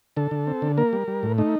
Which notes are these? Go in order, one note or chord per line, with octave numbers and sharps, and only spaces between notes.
D3 A4
D3
C4
D3
A#3 A#4
G3
G3
A2
A3 D#4